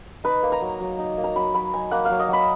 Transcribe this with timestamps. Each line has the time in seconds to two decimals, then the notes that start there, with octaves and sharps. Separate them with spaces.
0.24 D#4 B4
0.43 A#3
0.52 A#5
0.61 F#3
0.80 F#3
0.99 D#4
1.18 A#3
1.24 A#5
1.36 F#3 B5
1.54 F#3 B5
1.73 D#4 G#5
1.91 A#3 F#5
2.05 F#3 F5
2.19 D#5
2.29 F#3 B5